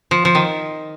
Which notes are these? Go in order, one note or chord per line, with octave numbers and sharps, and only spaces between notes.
F3
F3
D#3